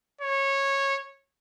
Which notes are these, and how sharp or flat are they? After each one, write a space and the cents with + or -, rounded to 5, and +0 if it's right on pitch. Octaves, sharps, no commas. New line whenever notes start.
C#5 -15